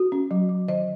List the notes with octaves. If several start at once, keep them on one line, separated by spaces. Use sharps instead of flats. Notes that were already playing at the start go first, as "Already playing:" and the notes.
Already playing: F#4
C#4
F#3
F#3
D#3 D#5